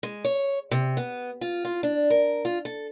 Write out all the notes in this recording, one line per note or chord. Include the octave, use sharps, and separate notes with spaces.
G#3
C#5
C3
B3
F4
F4
D4
A#4
F4
A4